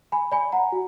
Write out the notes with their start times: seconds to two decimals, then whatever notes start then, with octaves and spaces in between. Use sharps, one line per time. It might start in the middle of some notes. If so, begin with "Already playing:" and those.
0.12 G#5 B5
0.32 D5 G#5 B5
0.52 F#5 A#5
0.72 F#4